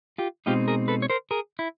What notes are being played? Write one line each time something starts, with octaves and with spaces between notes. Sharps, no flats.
F4 G4
B2 G#3 C4 D#4 F4 G4
G#4 A#4
A4 B4
C#5
A#4 C5
G#4 A#4
E4